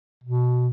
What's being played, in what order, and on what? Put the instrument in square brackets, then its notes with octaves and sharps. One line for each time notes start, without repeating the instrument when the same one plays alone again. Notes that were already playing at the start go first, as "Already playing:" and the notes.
[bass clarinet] B2